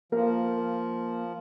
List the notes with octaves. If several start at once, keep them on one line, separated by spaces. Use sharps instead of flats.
F3 A#3 A#4